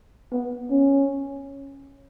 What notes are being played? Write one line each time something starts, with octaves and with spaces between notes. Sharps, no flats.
B3
C#4